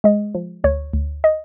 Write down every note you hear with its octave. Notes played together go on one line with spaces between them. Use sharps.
G#3 D#5
F3
D2 C#5
D2
D#5